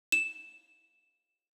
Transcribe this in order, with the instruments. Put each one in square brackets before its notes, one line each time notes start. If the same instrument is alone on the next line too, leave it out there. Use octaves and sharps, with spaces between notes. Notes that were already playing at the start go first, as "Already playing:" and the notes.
[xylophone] E7